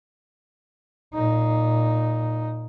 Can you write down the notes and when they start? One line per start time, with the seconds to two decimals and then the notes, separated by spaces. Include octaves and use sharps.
1.14 A#2 D#4